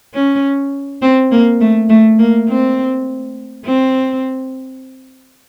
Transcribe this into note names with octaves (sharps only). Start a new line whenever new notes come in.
C#4
C4
A#3
A3
A3
A#3
C4
C4